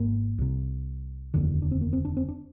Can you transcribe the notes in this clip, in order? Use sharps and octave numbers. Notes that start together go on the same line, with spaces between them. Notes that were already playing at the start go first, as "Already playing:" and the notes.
Already playing: G#1 G#2 A#3
C2 C3
F1 D#2 D3
D4
C4
A#3
C4
D4
C4
D4